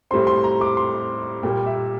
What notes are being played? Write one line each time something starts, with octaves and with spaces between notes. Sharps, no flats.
A2 G3 C4 C6
C6
A#5
D6
C6
A#2 G3 A#3 G5
E5